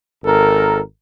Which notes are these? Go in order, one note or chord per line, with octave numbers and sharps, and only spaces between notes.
G#1 A4 A#4